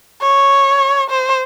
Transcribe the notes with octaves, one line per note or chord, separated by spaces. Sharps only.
C#5
C5